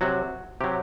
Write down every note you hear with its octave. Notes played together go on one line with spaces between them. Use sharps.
C3 F#3 F#4
C3 F#3 G4